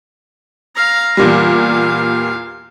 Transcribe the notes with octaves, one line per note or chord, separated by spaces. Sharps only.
F5 A#5
E2 A#2 G3 F5